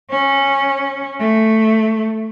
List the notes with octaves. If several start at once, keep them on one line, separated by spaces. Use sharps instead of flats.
C#4
A3